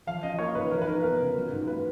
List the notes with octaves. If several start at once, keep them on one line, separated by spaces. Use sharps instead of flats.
F3 F5
C#4 D#5
A#3 C#5
G#2 B4
F3 A#4
B4
D#4 A#4
B3 A#4
C#3
F#3
G#2
A#3 B4